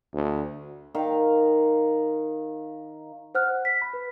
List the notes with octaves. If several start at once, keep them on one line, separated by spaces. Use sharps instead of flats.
D2
D#3 F5
C5 F#5 F6 F#6
B6
B5
B4